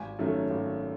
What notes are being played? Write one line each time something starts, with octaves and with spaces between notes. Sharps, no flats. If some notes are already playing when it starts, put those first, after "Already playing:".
Already playing: G#1 G#5
F#2 D#3 A3 C#4
G#1